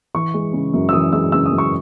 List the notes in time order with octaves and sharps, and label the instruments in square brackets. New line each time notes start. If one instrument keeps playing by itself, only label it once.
[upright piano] E3 C#6
G#3
C#3
F#2
E6
E3 D#6
G#3 E6
C#3 E6
D#6
F#2
C#6